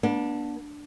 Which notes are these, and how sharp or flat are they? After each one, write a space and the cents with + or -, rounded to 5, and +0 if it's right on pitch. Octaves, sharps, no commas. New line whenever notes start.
B3 -40 D4 +0